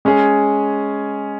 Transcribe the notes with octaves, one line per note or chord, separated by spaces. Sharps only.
G#3 C#4 G#4